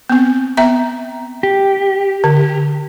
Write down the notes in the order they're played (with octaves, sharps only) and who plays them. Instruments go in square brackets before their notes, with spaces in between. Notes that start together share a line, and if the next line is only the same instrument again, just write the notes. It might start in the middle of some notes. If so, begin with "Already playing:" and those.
[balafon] B3 C4
B3 E5 A#5
[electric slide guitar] G4
[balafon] D3